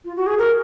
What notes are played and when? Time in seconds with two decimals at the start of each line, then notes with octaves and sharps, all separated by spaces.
0.05 F4
0.16 F#4
0.27 G#4
0.38 A#4